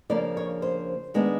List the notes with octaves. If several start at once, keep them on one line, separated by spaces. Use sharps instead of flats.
C#3 F3 A#3 D4 D5
C#5
C5
D#3 G#3 B3 D4